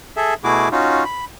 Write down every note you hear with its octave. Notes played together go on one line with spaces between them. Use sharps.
G#4 A4 E5
B2 A3 E4 F#4 G#4 D6
C#4 D#4 F4 F#4
B5